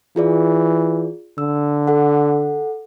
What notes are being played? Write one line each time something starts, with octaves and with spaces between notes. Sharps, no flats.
E3 F4 G#4 D5
D3 E6
A4 F#5